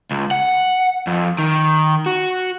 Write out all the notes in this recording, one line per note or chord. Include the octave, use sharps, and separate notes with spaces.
C#2
F#5
F2
D#3
F#4